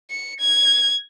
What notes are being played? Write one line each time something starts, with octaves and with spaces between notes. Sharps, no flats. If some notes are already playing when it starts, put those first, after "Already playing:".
C#7
G#6